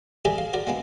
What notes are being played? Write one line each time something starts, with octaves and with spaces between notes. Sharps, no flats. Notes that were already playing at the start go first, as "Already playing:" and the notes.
G4 G#4 A#4 D5 E5 G#5
F5
F#4 A#4 D5
G#3 A#3 B3 D4